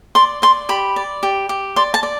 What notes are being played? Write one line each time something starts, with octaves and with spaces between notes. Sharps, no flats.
D5 C6
D5 C6
G4 B5
D5
G4
G4
D5 C6
A5
D5